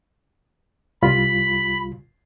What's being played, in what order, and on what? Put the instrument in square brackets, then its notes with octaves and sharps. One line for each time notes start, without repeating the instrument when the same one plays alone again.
[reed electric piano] C2 G3 F4 [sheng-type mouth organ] B5